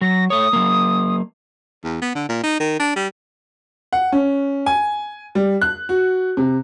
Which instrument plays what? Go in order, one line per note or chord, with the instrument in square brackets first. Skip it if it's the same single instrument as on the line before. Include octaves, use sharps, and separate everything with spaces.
[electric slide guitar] F#3 [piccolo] A#6
[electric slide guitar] A3 C#5 [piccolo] D#6
[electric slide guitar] F#3 A#3
[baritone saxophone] E2
B3
D3
A#2
D#4
D#3
D4
G3
[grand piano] F#5
C#4
G#5
G3
F#6
F#4
C3